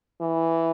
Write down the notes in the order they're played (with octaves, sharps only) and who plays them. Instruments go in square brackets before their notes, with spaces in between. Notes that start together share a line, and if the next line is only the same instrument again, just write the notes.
[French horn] E3